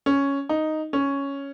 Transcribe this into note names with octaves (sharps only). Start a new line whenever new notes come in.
C#4
D#4
C#4